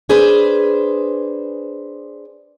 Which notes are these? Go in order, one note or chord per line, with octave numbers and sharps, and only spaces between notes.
D4 G#4 B4 C5